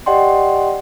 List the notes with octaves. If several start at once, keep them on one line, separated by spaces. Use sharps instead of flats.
G4 D5 D#5 F#5 G5 C6